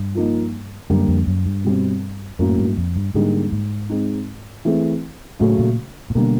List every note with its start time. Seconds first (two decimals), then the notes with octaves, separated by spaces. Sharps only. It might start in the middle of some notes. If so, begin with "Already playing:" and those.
Already playing: G2
0.14 F3 A#3 D#4
0.90 F#2 D3 G3 A#3
1.08 F2
1.27 F#2
1.46 G2
1.64 B2 G3 C4
2.39 F#2 A2 F#3 A#3 C#4
2.58 G2
2.77 F2
2.96 G2
3.14 G#2 D3 G3 A#3 D#4 G#4
3.52 G#2
3.90 G#3 C4 D#4
4.65 E3 A3 C4 E4 G#4
5.40 A2 C#3 F#3 A3 C#4
5.59 A#2
6.10 A#2
6.15 B2 D3 G3 A#3